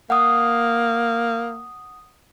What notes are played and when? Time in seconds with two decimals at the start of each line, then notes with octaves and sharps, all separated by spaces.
0.10 A#3 F#5 D#6